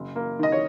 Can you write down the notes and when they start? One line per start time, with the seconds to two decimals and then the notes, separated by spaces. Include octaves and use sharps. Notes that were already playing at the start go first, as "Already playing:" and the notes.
Already playing: F#1
0.16 A#3
0.39 D#3 D#5
0.52 C#5